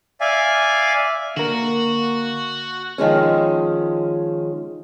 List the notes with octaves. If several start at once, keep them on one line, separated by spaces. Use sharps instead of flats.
D5 E5 F5 G#5
D3 A#3 F#4 A#4
D#3 F3 G#3 C#4